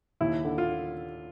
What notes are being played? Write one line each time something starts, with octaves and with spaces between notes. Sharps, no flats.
D#2 E4
D3
F4